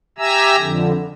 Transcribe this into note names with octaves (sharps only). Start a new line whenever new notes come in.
G4 E5 G#5 A#5 E6
F2 D3